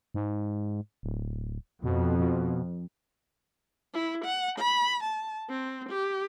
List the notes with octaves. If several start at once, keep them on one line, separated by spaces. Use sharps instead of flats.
G#2
D1
F2 B2
B2
E4
F#5
B5
A5
C4
G4